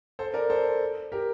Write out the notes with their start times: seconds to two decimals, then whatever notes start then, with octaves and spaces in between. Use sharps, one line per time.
0.19 A4 C5
0.34 A#4 D5
0.50 A4 C5
1.12 G4 A#4